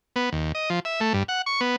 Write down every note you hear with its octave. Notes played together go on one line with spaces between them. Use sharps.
B3
D#2
D#5
F3
E5
A3
G2
F#5
C#6
B3